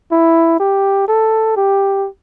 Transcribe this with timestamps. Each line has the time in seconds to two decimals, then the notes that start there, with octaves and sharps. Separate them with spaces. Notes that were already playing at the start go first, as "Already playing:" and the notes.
0.12 E4
0.60 G4
1.08 A4
1.57 G4